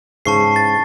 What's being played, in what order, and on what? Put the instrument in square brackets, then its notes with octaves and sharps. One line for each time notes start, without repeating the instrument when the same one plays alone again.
[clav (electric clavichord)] G#2 C#3 E3 [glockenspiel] A5 C#6 C7
[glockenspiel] A6